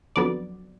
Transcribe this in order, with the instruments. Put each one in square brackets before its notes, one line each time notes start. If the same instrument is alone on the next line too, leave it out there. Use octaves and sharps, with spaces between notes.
[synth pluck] F2 D3 F#3 B3 D5